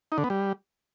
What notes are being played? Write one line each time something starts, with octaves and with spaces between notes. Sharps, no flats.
D#4
D3
B3
G3